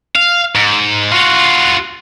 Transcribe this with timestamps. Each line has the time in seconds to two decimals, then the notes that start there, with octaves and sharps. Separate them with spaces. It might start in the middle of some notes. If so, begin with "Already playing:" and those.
0.16 F5
0.55 G#2
1.12 F4 F#4